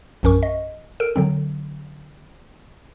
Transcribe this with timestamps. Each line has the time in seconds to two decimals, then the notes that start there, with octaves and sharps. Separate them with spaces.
0.23 A#1 F#2 C#4 A#4 C#6
0.43 D#5
1.00 A4 A#4 D7
1.16 D3 F#3 C4